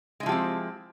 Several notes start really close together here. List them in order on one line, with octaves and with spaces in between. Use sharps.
G#3 E4 F3 G4 C4